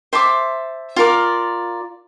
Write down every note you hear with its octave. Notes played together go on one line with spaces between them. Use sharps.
C5 E5 A5 D6
F4 A#4 D5